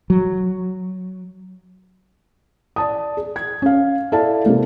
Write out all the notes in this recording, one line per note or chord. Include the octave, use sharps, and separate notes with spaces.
F#3
D5 A5 D#6
G#4
G#6
C#4 F5
E4 A4 D5 F5 A5
C3 G#3 A#3 A4